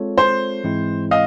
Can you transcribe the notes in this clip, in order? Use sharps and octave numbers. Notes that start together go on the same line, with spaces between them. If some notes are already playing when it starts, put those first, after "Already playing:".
Already playing: G#3 C4 F4 A4 C#5
C5
G#2 E3 G#3 C4 E4
D#5 F5